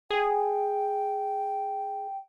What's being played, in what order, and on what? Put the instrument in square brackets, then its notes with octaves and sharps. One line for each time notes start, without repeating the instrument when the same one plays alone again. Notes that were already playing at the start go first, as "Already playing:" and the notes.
[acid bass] G#4 [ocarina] G5